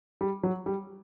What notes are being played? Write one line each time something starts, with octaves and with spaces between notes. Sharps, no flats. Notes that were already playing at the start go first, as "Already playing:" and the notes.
G3
F#3
G3